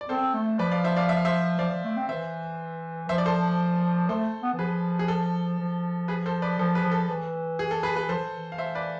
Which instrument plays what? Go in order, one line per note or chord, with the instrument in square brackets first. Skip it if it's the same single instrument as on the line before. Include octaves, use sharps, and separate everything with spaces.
[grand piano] D5
[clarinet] C4 [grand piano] A4 C5
[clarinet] A3
[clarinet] F3 [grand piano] B4 D5
[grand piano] D5 F5
C5 E5
D5 F5
E5
F5
C5 E5
[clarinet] F3 [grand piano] D5 F5
[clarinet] F3
A3
C4
[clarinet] E3 [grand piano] C5 E5
[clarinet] F3 [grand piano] C5 E5
[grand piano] D5
A4 C5
[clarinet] A3 [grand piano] A4 C5
[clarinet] B3
E3
[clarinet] F3 [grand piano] G#4 B4
[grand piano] G#4
A4
[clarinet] F3
[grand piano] G#4 B4
A4 C5
B4 D5
[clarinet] F3 [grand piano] A4 C5
[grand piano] G#4 B4
[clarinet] F3
[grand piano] A4
[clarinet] E3
[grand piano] G#4
A4
G#4 B4
G#4 B4
[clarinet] F3 [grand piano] A4 C5
[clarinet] E3
E3
[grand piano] F5
C5 E5
B4 D5